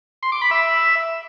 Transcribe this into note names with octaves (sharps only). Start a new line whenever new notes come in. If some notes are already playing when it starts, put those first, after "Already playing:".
C6
D6
B5
E5